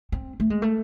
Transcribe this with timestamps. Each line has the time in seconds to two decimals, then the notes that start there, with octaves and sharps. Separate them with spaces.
0.12 C4
0.40 A3
0.50 G#3
0.62 A3